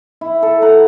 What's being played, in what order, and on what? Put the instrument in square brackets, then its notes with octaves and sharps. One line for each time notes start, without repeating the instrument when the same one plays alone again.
[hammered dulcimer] E4
A4
F#5 A#5